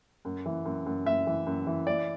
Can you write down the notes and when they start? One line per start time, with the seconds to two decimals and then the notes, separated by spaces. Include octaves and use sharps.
0.25 F#2
0.46 E3
0.65 F#2
0.86 F#2
1.06 F#2 E5
1.27 E3
1.47 F#2
1.67 E3
1.87 E3 D5